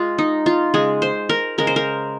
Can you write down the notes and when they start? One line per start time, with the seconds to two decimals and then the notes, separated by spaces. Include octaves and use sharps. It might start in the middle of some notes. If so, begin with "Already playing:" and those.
Already playing: G#3 F4
0.18 D#4
0.46 F4
0.74 C#3 G#3 G#4
1.02 C5
1.29 A#4
1.58 C#3 G#3 A#4
1.67 C5
1.76 A#4